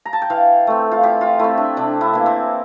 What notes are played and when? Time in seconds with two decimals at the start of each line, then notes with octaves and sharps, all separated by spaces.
0.05 A#5
0.13 A5
0.22 G5
0.30 E3 F5
0.67 A3 C4
0.91 F4
1.03 E3 G4
1.21 F4
1.39 A3 C4 E4
1.58 D4
1.77 C3 D4
2.01 E4
2.13 E3 A#3
2.26 C4